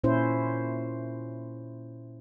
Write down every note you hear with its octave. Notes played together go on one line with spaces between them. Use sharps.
A#2 C#4 E4 C5